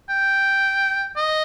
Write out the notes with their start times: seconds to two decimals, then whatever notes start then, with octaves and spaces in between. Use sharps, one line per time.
0.09 G5
1.17 D#5